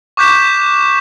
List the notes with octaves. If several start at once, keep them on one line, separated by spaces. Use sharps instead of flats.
C#6 D6 F#6 G6 B6 E7